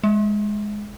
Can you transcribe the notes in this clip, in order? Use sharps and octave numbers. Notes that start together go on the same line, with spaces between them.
G#3